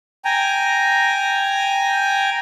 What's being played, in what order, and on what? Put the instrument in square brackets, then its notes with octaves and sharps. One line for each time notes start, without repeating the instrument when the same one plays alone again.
[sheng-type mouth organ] G5 G#5 A#5